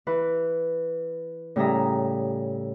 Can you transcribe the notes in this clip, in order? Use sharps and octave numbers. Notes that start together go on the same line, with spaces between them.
E3 B4
A2 C#3 G3 E5 A#5 D#6